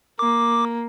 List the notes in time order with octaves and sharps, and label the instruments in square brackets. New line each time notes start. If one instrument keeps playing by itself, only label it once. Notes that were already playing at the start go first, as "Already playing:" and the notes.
[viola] A#3 [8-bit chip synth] D6